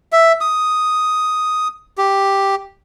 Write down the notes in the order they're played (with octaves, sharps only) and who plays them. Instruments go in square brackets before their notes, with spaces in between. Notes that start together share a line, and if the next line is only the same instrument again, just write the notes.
[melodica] E5
D#6
G4